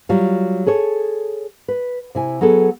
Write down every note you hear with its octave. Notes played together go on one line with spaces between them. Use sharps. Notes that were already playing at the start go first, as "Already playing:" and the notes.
F#3 G3 F4
G#4 A4 C#5
B4
C3 E4 G#5
F#3 B3 G#4 A4